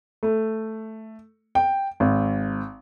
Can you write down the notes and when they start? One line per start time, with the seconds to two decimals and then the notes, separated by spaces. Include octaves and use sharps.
0.23 A3
1.55 G5
2.00 G#1